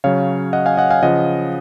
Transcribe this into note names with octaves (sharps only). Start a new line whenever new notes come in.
C#3 F#3 C#5 F5
D#5 F#5
F5 G#5
D#5 F#5
F5 G#5
C#3 F3 D#5 F#5